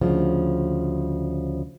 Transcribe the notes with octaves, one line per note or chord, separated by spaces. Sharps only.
D2 C#3 F3